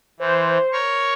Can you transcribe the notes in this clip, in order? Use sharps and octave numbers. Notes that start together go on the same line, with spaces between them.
E3 C5
A#4 C#5 C#6